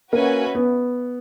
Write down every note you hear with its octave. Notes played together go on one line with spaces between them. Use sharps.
A#3 C#4 F#4 B4 E5 G#5
B3